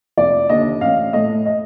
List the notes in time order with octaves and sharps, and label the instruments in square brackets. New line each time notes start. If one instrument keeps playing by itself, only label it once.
[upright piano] F1 D5
D#2 D3 D#5
A1 F5
A2 A3 D#5
D#5